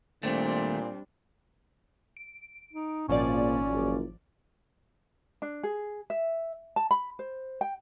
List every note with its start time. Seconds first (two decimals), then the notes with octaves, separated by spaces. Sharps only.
0.23 D#2 A#2 G3 A3 C4 D4
2.17 D7
2.73 D#4
3.09 G#1 A#2 F3 C#4 D5
3.71 F#1 A#2
5.42 D4
5.63 G#4
6.10 E5
6.76 A5
6.91 B5
7.19 C5
7.61 G5